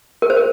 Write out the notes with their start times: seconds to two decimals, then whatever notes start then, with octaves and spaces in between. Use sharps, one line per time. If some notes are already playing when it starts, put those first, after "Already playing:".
0.22 A#4
0.30 C5
0.37 A#4